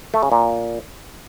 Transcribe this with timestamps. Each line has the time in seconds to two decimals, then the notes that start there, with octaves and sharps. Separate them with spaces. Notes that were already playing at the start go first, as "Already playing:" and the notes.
0.14 A3
0.23 C#3
0.32 A#2